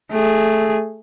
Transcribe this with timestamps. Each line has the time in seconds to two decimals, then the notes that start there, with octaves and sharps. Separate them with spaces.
0.11 A3 G#4